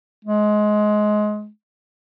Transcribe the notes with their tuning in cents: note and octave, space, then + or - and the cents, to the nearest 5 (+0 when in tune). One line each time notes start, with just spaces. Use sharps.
G#3 +20